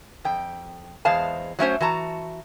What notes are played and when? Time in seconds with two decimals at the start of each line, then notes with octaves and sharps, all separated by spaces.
0.25 F2 G5
1.05 E2 G#3 C5 F5 A5
1.59 F#3 A3 C#4 C5
1.80 E3 F#4 A5 A#5